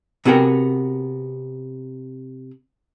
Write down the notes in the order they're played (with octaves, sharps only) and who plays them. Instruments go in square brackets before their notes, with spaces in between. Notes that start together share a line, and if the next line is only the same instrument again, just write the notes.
[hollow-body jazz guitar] C3 B3 F#4 G#4 A#4 G5